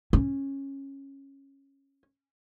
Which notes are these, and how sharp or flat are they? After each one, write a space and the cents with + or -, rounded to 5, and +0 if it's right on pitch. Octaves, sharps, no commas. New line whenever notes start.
C#4 -15